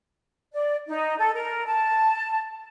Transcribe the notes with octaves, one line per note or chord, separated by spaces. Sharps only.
D5
D#4
A4
A#4
A5